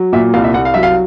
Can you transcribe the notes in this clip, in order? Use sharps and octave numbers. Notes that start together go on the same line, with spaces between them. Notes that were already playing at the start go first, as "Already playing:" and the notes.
Already playing: F#3
A#2 E5
C2 F5
E5
C2 F#5
F5
F#3 E5
F5